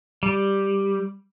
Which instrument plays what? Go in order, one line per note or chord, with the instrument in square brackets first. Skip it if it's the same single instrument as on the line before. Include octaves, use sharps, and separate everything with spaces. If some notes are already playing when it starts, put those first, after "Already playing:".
[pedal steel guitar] G3